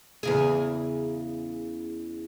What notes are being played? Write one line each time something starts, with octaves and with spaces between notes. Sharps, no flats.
E2 C#3 G#4